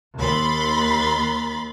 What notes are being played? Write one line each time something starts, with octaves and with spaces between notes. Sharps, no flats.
D#2 B5 C6 A6